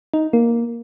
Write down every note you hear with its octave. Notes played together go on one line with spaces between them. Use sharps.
D#4
A#3